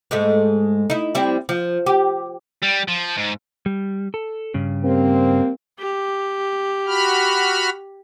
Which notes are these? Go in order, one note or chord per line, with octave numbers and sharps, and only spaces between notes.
G#2 G#3 A3
D#4 E4
G3 C4 E4
F3
G4
G3
F3
G#2
G3
A4
G2 C#3
G3 A#3 C4
G4
F#4 B5 F6